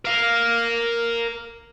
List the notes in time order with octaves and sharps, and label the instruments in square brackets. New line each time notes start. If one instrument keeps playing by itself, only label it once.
[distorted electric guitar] A#4 F5